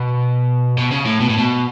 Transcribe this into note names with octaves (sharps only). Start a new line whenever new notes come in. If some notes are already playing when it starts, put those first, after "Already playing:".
Already playing: B2
B2
C#3
A2
B2
A2
B2